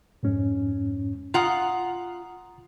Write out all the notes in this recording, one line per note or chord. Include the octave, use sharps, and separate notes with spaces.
F2 G#2 C#4
F4 F#5 A#5 D#6